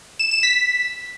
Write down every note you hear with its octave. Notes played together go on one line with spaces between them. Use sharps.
E7
E7
B6